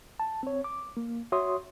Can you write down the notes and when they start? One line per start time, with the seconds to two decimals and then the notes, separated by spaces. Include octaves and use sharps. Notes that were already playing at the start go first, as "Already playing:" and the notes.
0.20 A5
0.43 C4 C#5
0.64 D6
0.97 A#3
1.32 F#4 C#5 E5 C6 D#6